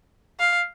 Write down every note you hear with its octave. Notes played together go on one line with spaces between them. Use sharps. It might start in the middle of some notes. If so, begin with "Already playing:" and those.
F5